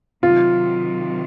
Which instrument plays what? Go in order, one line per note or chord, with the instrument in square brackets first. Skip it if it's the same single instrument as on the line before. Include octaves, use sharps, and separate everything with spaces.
[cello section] C3 D#3 F#3 [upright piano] F4